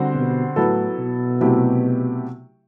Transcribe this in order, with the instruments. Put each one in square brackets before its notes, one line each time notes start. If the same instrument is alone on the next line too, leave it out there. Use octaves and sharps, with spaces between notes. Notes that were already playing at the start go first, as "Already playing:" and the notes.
Already playing: [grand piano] D3 G3 C4 F#4 C5
[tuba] B2
[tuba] A2 [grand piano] F#3 B3 E4 A4
[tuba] B2
[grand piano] C3 F#3 A3 E4 G4